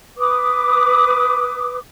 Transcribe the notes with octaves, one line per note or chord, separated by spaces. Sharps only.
B4 D6 D#6